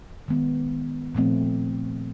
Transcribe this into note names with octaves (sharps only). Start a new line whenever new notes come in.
D#3 G#3 B3
A#2 F3 A3 C4